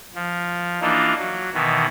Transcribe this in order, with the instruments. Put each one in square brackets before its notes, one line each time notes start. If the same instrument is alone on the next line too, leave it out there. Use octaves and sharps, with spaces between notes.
[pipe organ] F3
E3 A#3 D4 D#4 F4
F#3
B2 D#3 E3